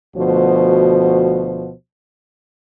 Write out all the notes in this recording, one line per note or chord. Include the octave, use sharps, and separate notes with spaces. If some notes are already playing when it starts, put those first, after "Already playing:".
D2 B2 F3 F#4 C5